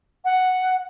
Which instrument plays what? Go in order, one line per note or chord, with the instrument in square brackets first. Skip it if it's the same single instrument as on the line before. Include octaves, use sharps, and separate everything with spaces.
[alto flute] F#5